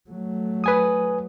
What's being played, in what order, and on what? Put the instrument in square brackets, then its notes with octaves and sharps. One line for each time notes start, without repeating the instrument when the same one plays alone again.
[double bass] F#3 A3
[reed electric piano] B4 G#5 D#6